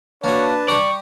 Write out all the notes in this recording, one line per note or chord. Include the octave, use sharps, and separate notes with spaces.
A#3 D4 F#4 B4 C#5 A5
G3 G4 D5 A#5 C#6